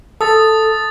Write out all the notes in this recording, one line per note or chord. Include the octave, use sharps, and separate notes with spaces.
A4 D#6 A6